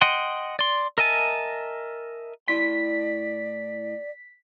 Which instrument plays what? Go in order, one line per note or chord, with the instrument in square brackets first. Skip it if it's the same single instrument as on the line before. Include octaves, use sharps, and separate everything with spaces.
[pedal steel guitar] D#5 F#5 G5 C6
D5 C6
A#4 D#5 E5 G#5 A5
[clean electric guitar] A2 E4 C6 [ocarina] D5 [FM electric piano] B6